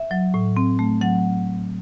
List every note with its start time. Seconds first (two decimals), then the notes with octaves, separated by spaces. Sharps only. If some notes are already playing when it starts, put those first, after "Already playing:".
Already playing: E5
0.11 F#3
0.34 A2
0.56 C4
0.79 A3
1.01 F#3 F#5